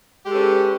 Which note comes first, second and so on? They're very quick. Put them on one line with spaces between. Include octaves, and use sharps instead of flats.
G4 G#3 A4 B4 C#4